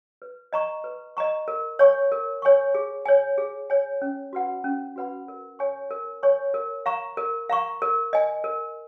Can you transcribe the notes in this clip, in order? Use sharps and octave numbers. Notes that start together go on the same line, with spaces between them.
B4
D#5 A#5 C#6
B4
D#5 A#5 C#6
A#4
C#5 G#5 C#6
A#4
C#5 G#5 C#6
G#4
C#5 G#5
G#4
C#5 G#5
C#4
F#4 B4 F#5 B5
C#4
F#4 B4 F#5 B5
A#4
C#5 G#5 C#6
A#4
C#5 G#5 C#6
A#4
F5 A#5 C#6
A#4
F5 A#5 C#6
A#4
D#5 G#5
A#4